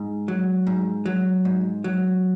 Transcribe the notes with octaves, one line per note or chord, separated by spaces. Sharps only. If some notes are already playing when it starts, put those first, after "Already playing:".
Already playing: G#2
F#3
G#2
F#3
G#2
F#3